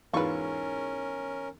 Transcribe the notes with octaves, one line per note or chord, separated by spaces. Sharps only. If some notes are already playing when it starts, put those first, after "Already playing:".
E2 G#2 C#4 F4 A#4 B4 C#6